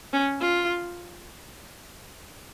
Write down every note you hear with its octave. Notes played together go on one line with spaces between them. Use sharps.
C#4
F4